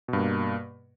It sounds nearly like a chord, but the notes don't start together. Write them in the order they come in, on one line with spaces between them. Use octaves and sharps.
B2 G2 A#3